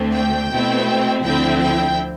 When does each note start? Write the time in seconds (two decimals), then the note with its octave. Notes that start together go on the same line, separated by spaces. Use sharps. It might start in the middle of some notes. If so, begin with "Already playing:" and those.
Already playing: D2 D3 A3 C4
0.13 G5
0.50 B2 A3 C4 E4
1.23 D2 D3 F3 C4 E4 G5
1.59 G5